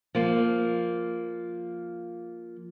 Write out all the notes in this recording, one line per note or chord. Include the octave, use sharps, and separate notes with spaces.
F3 A#3